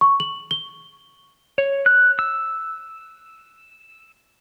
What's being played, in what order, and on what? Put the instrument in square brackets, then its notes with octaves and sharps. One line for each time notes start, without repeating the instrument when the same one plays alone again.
[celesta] C#6
F#7
G7
[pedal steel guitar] C#5
F#6
E6